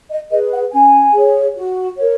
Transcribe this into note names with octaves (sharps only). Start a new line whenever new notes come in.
D#5
G#4 B4 D#5
F#5
C#4 G#5
G#4 C#5
F#4
A#4 C#5